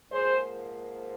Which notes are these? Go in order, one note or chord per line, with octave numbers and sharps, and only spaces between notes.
G#2 F3 A#3 G#4 C5